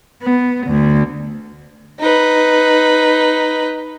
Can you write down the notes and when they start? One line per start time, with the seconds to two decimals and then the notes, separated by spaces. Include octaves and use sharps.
0.23 B3
0.67 D2
2.00 D#4 B4